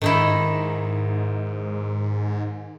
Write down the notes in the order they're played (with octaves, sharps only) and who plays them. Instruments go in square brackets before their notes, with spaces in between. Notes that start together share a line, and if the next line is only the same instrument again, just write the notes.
[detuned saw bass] G#2 [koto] D#3 D#4 E4